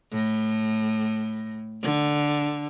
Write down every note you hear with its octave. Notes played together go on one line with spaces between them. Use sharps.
A2
D3